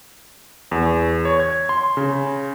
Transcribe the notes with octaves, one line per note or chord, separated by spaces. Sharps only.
E2
C#5
G#6
C6
C#3